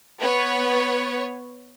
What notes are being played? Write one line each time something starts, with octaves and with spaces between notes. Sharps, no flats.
B3 B4 C#5